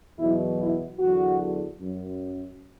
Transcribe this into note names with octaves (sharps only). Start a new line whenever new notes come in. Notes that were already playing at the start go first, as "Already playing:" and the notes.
E2 B2 F#3 E4
E4
E2 D3 F#3 F#4
F#2